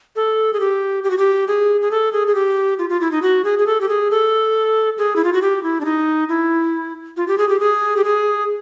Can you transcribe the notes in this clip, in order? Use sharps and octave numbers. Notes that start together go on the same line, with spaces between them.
A4
G#4
G4
G4
F#4
G4
G#4
G#4
A4
G#4
G#4
G4
F4
F4
E4
D#4
F#4
G#4
G#4
A4
G4
G#4
A4
G#4
E4
F4
F#4
G4
E4
D4
D#4
E4
F4
G4
G#4
G4
G#4
G4
G#4